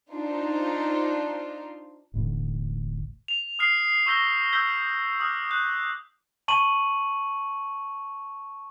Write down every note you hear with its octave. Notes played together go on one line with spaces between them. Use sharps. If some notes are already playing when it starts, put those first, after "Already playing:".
D4 D#4 F4 C5
E1 A1 A2 D3
F7
D#6 F6 C7
C#6 E6 G6 A#6 B6 G7
D#6 E6 G6 B6 G7
D6 D#6 F6 F#6
F#6
A5 C#6 D#7 F#7